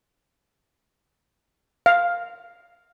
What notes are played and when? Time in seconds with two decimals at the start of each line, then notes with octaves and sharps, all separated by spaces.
1.86 F5